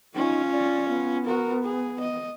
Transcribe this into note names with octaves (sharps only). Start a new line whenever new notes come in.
C#4 D#4 F4
D5
B3
F#4 A#4
G#4
D#5